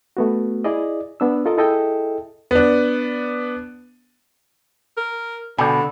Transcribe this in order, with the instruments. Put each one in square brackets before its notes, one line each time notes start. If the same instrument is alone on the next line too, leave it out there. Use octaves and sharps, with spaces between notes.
[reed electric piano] A3 B3 F#4
E4 G#4 D5 D#5
B3 D4 E6
F4 A4 A#4 D#5
E4 G#4 A4 D#5 E5 G5
[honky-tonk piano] B3 D4
[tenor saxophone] A#4
[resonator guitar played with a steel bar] B2 [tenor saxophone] D3 [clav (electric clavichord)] D5 G5 G#5